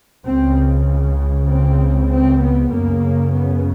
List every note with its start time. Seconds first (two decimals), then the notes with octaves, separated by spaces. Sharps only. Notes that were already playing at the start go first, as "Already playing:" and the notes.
0.24 C#2 C#3 C4
1.48 C4
2.09 C4
2.40 B3
2.71 F#2 C#3 A#3
3.32 B3